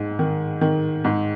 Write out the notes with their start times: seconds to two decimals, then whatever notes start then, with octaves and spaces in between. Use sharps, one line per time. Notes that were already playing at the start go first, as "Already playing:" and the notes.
Already playing: G#2
0.19 D#3
0.61 D#3
1.04 G#2